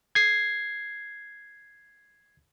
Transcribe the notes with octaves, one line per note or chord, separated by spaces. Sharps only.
G#6 C7